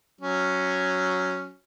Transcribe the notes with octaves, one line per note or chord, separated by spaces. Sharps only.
F#3 C#4